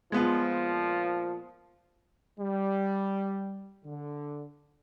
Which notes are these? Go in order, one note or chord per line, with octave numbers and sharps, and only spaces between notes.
A#2 F3 G#3 B3 F4
G3
D3